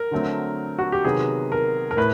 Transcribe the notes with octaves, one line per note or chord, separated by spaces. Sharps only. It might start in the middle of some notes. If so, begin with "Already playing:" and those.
Already playing: A#4
D3 F#3 A3 C4
F#4
G4
C3 D#3 F#3 B3 G#4
A#4
A#4
A2 B4